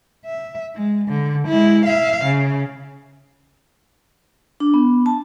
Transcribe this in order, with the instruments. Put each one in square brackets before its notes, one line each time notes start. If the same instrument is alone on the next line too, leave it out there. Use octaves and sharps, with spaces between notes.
[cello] E5
G#3
D3
G#3 E4
E5 F5
C#3
[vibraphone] D4
B3
A5